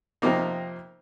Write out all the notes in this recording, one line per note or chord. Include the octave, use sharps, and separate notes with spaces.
F2 C3 F3 A#3 D#4